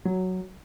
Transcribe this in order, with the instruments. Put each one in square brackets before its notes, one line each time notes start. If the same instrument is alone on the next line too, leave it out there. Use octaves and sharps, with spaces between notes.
[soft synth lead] F#3